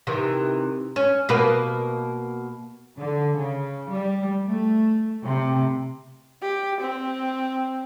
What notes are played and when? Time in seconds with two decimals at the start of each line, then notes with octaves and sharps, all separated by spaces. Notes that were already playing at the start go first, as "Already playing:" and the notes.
0.07 C3 D#3 E3
0.96 C#4
1.29 B2 A#3 B4
2.99 D3
3.37 C#3
3.90 G3
4.47 A3
5.24 C3
6.42 G4
6.81 C4